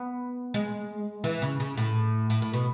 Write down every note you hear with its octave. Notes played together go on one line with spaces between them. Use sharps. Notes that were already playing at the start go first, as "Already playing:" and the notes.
Already playing: B3
G#3
E3
C#3
C#3
A2
A2
A2
B2